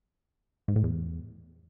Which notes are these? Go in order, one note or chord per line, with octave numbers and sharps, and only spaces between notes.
G#2
A2
E2